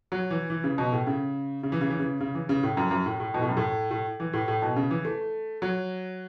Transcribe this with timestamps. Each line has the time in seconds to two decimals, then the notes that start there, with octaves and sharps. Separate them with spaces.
0.12 F#3
0.30 E3
0.50 E3
0.64 C#3
0.78 B2
0.92 A2
1.07 C#3
1.63 C#3
1.72 E3
1.81 C#3
1.90 E3
1.99 C#3
2.20 C#3
2.35 E3
2.49 C#3
2.63 A2
2.77 F#2
2.91 F#2
3.06 A2
3.20 A2
3.34 B2
3.42 A2
3.49 F#2
3.57 A2
3.91 A2
4.20 E3
4.33 A2
4.48 A2
4.62 B2
4.76 C#3
4.91 E3
5.05 A3
5.62 F#3